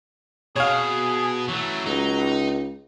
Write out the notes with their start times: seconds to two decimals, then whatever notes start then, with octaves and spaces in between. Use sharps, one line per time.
0.56 B2 G#4 C#5 F5
1.49 E3 F#3 A3
1.87 C#2 D#4